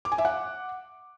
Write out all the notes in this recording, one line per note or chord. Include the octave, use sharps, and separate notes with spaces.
D6
G#5
E5
F#5